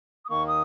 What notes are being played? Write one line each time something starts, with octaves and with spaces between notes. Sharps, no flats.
D#6
D#2 D#3 A#3 C#6
D#6